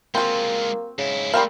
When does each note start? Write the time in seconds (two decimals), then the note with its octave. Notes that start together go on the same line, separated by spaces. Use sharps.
0.15 G#3 A#3 C4 F4 F#4
0.99 G#2 C#3 E4
1.34 G3 A3 A#3 C4 A#4 F5